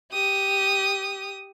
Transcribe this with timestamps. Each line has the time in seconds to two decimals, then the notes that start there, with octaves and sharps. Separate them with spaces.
0.12 G4 D#6